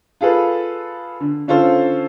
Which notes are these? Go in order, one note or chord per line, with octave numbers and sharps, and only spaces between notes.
F4 G#4 A4 B4
D3
D3 C#4 F4 A4 C5